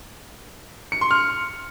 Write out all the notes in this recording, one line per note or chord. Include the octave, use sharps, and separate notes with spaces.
C#7
C6
F6